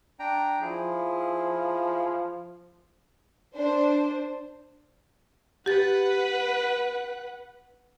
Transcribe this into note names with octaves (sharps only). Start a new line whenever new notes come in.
D4 G5 A#5
F3 E4 G#4
D4 C5
G4 B4 F#5 A6